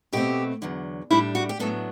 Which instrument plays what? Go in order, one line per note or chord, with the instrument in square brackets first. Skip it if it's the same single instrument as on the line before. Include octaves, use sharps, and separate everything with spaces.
[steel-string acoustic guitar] B2 A3 C4 G4
E2 D3 F#3
A2 G3 D4 E4
F#4
G4
A2 F#3 B3 D4 A4